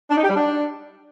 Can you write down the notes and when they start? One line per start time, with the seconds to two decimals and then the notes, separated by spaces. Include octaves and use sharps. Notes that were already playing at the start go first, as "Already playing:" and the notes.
0.11 D4
0.17 D#4
0.23 G4
0.30 G3
0.36 D4